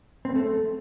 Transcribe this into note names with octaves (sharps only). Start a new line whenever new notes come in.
C4
A3